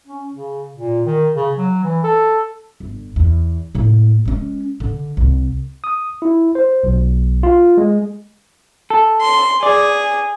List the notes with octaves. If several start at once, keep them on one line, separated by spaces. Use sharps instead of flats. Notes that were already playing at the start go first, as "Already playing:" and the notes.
C#4
C#3
A#2
D#3
C#3
F#3
E3
A4
G1
E2
A2 A#3
G#3 C#4
D3
C2
D#6
E4
C5
B1
F4
G#3
A4
C6
G#4 D5